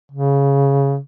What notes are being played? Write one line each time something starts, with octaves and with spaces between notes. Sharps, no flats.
C#3